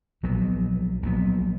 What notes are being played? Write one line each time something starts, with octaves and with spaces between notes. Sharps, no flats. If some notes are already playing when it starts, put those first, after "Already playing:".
A#1 A#2 F#3 B3
A#1 A#2 F#3 B3